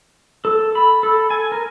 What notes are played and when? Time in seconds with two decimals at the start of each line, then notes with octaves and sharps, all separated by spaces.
0.45 A4
0.75 B5
1.03 A4
1.30 G#5
1.52 A#4